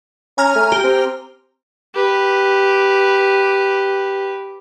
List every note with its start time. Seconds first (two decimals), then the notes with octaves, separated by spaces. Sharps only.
0.38 C#4 G#5 A#5 F6
0.56 A3
0.72 G4 A#5
0.84 C4
1.94 G4 B4